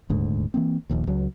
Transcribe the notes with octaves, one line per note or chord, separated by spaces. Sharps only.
D#1 D2 G#2
E3 A#3 C4
D#1 A#1 D#2
C#2 F#3